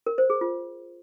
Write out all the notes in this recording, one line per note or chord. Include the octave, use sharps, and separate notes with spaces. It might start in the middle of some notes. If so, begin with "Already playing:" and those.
A#4
C5
G#4
F4